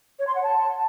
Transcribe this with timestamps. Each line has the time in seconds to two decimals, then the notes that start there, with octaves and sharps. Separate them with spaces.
0.19 C#5
0.27 C6
0.35 F#5
0.43 A5